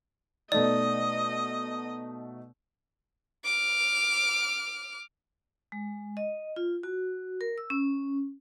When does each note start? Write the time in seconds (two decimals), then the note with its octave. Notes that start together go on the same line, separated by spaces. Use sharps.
0.52 B2 A3 D#4 D5 D#5
3.44 D6 F6
5.72 G#3
6.17 D#5
6.56 F4
6.83 F#4
7.41 A#4
7.58 E6
7.70 C#4